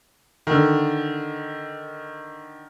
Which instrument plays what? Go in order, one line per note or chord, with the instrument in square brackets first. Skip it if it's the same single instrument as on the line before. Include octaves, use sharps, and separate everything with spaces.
[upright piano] D3 D#3